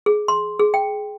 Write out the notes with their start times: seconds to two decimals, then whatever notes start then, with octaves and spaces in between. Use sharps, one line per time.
0.06 G#4
0.28 C6
0.59 G#4
0.74 G5